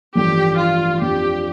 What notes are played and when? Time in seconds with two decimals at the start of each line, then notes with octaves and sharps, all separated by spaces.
0.15 A1 G2 F3 A3 G4
0.59 F4
1.02 F2 F3 D4 G4